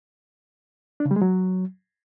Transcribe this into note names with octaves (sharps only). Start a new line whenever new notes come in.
D4
C#3
G3
G#3
F#3